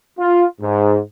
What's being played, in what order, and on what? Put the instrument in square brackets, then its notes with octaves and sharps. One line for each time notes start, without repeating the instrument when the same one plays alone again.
[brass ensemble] F4
G#2